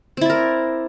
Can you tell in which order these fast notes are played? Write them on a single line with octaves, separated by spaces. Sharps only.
C4 E4 D5 A#4